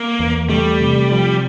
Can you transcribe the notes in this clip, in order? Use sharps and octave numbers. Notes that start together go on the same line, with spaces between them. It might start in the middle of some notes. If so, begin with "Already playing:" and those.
Already playing: A#3
E2
G3 A3
C3
F3